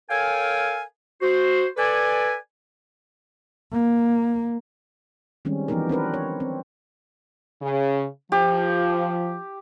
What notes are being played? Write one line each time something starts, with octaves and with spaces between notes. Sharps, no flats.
A4 A#4 C#5 F5 G5 G#5
F#4 C5
A4 B4 D5 G#5
A#3
D#3 G3 G#3 C4 C#4
E3 F3 B3 D#4 G4 A#4
C4 D4 A#4 B4
C#5
C4
C#3
F3 G4